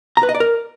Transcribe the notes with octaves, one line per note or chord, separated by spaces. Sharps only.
A#5
B4
D#5
D5
A#4